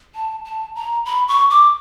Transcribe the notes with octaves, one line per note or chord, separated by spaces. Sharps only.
A5
A5
A#5
B5
C#6
D6